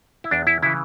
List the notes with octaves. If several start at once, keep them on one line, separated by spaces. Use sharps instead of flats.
E4
E2 D4
E4
C#3 E3 E4